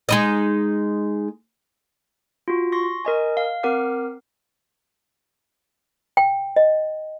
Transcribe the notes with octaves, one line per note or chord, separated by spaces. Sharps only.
G#3 D#4 D#5
F4 F#4
C6 C#6 A#6
A#4 D#5 G#5
F5
C4 A#4 F#5 D6 F6 C7
G5
D#5